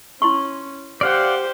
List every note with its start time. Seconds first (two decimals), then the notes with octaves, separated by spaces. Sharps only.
0.22 C#4 E4 C6 C#6
1.01 G4 C5 D5 F5 F#5